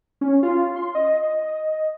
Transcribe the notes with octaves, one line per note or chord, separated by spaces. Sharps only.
C#4
F4
C6
D#5